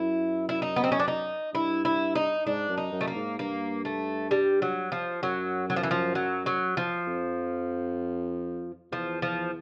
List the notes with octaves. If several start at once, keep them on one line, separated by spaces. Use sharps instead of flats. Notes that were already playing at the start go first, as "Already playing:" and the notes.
Already playing: F#2 E4
E4
D#4
B3
C4
C#4
D4
D#4
G2 E4
E4
D#4
G#2 D4
F#2
D#4
F#2
A3
A#3
G#2
G2 A#3
A3
G3
F#3
F3
F#2 F#3
F#3
F3
E3
F3
F#3
F#3
F3
F2
E2 F3
F3